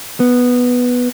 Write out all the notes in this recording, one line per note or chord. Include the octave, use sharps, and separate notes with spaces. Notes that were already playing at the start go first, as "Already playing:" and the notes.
B3